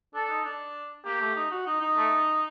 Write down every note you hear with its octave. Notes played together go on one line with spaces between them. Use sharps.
D4 A4
D#4
D4
A#3 G4
A3
D#4
F#4
D#4
D#4
A3